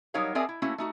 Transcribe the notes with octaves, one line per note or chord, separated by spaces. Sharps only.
F#3 G3 D#4 A#4 C#5 F5
C4 G#4 A#4 D5 E5 G#5
E4
A3 A#3 C#4 E4 F#4
A3 D#4 F#4